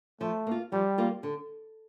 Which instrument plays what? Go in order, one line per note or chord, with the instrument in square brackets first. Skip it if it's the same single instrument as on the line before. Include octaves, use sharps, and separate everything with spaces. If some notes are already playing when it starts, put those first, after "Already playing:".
[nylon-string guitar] F3 [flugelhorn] A3
[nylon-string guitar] A#3 F4
[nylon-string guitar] F3 [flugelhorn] G3
[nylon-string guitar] A#3 F4
D3